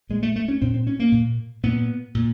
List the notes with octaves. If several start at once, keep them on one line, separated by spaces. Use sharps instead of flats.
A#2 G#3
A3
A3
C#4
A#2 C4
C4
C#4
A#3
A#2
A#2 B3
A#2